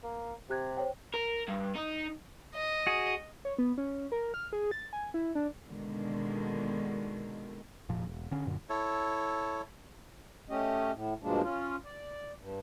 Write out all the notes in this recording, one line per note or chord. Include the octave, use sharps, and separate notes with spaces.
A#3
C3 G4 F#6 G#6
C5 C#5 G5
A#4
G2
D#4
D#5
F#4 G#4
C#5
B3
C#4
A#4
F6
G#4
A6
G#5
E4
D4
B2 D3 D#3 G#3 A#3
F1 A#2 F3
E1
D3 C#4
F#2 A#2 D3
E4 A4 C#5
A3 C#4 G4 D#5
A2
G2 B2 F3 G#3 A#3 D4
C#4 F4
D5
G2